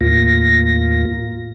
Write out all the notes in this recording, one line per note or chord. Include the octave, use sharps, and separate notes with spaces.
D#2 A2 A#3 F4 A#6